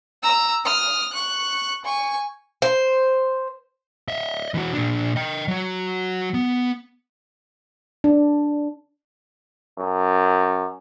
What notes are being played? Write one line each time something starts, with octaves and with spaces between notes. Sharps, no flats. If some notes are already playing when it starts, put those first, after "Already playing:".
A#5 E6
D#6 F6
C#6 F#6
G#5 C#6
C5
D#5 E5
E3 F#4
A#2 D4
D#5 G5
F#3 F#4
B3
D4
F#2